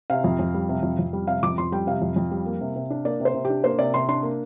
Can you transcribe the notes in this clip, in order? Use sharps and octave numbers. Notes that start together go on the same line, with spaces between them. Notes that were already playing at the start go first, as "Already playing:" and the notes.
C3 F5
F2
F2
G3
C3
F2
F2
G3
C3 F5
F2 D6
F2 C6
G3 G5
C3 F5
F2
F2
G3
A#3
C3
C3
D4
A#3 D5
C3
C5
C3
G4
D4
A#3 C5
C3 D5
C3 C6
D4 C6
A#3